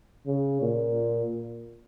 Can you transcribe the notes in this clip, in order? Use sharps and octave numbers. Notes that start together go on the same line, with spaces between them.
C#3
A#2